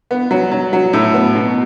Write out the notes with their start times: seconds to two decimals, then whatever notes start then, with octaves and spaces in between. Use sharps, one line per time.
0.11 B3
0.31 F#3
0.51 F#3
0.73 F#3
0.93 A2
1.14 B3
1.35 B2